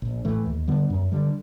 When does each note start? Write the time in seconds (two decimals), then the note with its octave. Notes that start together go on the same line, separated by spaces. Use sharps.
0.02 A#1
0.25 A2 E3 A3
0.46 D#2
0.68 D3 G3 B3
0.90 F#2
1.12 D3 G3